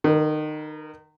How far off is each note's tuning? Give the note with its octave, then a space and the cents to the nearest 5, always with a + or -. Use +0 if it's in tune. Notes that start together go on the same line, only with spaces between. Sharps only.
D#3 -30 A#4 +40